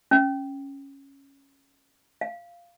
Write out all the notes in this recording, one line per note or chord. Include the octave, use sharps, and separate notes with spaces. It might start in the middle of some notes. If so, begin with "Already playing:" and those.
C#4
F5